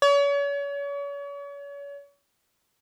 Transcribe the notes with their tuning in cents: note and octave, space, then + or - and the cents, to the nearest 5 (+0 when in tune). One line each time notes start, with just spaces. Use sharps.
C#5 +40